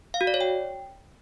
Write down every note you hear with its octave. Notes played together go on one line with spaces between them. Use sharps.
F5
F#4
D5
C#5
G5